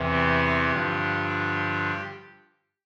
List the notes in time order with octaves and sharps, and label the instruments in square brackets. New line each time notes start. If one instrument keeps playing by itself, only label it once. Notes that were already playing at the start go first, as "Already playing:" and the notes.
Already playing: [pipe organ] E2 C3 E3
G4
G2 D3 F3